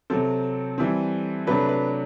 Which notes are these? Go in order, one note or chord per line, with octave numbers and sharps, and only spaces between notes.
C3 F#3 C4 A4
E3 G3 C4
C3 F#3 A3 D4 B4
B4